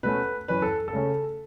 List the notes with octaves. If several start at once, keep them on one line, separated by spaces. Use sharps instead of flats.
B2 A3 C#4 B4
F#2 E3 C#4 B4
A4
A4
C#3 A3 C#4